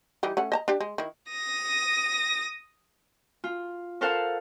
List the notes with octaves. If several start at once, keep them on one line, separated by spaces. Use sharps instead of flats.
E3 G3 D#4
A3 C#4 F#5
D#5 A5 A#5
D4 G4
G#3
D#3 E4
D#6 A#6
F4
A4 A#4 C5 F5 F#5 A5